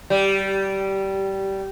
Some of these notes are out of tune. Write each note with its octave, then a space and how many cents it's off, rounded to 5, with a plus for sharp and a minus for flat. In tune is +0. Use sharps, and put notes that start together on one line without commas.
G3 -15